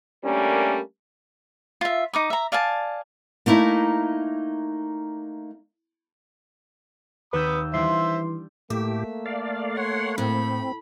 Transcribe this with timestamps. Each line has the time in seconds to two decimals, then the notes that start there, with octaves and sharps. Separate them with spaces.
0.24 G3 A3 A#3 C#4 D4 A#4
1.81 F4 E5
2.13 D#4 D6 D#6
2.30 E5 A#5
2.52 D5 F5 G#5 A5
3.46 A3 A#3 D#4 E4 E5
7.33 D#2 B4 B5 D#6 E6 G6
7.74 E3 G3 D4 C5 E5 C6
8.70 A2 A3 A#3 G4 E5
9.26 D5 F5
9.77 C#5 F#5 C6
10.18 A2 C4 B5